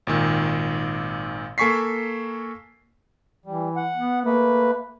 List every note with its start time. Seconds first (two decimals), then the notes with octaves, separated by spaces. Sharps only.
0.07 G#1 A#2 D#3
1.58 A#3 A4 G#5 C#6 B6 C7
3.46 E3 G3
3.76 F#5
3.96 B3
4.25 A3 A#3 B4